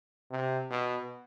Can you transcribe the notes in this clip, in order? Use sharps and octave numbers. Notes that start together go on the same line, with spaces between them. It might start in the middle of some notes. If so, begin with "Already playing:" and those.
C3
B2